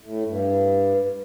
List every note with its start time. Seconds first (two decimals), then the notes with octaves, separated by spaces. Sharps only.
0.01 A2
0.26 G2